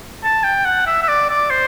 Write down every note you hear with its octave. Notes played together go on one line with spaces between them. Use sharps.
A5
G5
F#5
E5
E5
D5
D5
C5